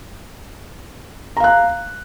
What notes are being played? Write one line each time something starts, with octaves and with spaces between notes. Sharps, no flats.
F5 A#5 F#6